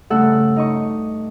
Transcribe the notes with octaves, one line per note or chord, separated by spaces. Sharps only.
G2 C#3 A3 A4 F#5 E6
D#4 D#5 C#6